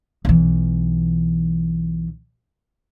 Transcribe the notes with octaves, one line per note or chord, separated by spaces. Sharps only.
B1 E3